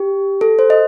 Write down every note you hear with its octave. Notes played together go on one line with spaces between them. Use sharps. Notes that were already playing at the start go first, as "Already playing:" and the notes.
Already playing: G4
A4
C5
D#5